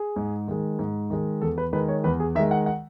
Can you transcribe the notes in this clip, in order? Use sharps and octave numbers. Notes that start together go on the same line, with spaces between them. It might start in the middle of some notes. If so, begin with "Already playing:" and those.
Already playing: G#4
G#2
D#3 G#3
G#2
D#3 G#3
E2 A4
B4
D#3 G#3 B4
C#5
E2 B4
G#4
D#3 G#3 E5
F#5
F#5